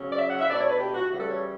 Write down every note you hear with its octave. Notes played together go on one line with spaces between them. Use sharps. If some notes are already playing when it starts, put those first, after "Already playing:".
Already playing: C#3 F#3 C#4
D5
E5
F#5
E5
B2 A3 D4 D5
C#5
B4
G4
F#4
C#3 E3 G3 F#4
A4
C#5